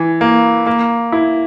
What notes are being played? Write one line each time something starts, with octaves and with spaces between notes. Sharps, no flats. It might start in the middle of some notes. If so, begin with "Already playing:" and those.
Already playing: E3
A#3
A#3
E4